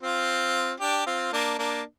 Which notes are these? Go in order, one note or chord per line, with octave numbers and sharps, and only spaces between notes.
C4 F4
D4 G4
C4 F4
A#3 D4
A#3 D4